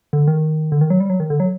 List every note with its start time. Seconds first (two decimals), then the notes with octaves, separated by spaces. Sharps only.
0.13 D3
0.27 D#3
0.72 D3
0.81 D#3
0.90 F#3
1.00 G3
1.10 F#3
1.20 D#3
1.30 D3
1.40 F#3